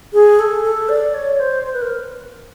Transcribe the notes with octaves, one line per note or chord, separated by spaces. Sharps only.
G#4
A4
A4
D5
C#5
C5
C5
B4
A#4